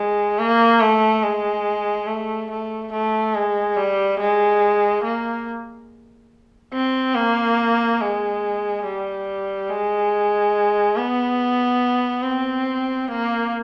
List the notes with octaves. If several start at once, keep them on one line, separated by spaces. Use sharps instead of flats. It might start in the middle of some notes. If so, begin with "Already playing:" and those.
Already playing: G#3
A#3
A3
G#3
A3
A3
A3
G#3
G3
G#3
A#3
C4
A#3
G#3
G3
G#3
B3
C4
A#3